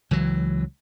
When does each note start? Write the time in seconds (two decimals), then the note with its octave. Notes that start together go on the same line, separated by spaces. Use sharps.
0.11 C#2 E3 F#3